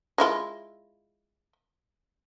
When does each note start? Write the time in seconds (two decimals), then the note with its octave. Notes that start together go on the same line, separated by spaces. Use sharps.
0.18 G#3 E4 F4